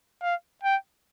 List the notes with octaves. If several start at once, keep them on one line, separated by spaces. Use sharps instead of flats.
F5
G5